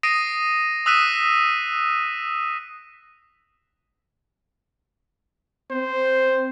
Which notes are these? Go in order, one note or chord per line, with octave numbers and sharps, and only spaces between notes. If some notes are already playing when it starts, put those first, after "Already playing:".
D#6 A#6 C7 D7 D#7
D#6 E6 F#6 B6 D#7 E7
C4 C5